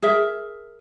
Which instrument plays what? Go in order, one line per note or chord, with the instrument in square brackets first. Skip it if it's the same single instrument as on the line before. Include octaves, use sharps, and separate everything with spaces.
[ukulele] G#4 A#4 E5